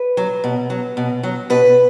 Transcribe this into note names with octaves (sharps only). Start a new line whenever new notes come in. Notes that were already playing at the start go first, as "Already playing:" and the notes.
Already playing: B4
F#3
B2
F#3
B2
F#3
B2 B4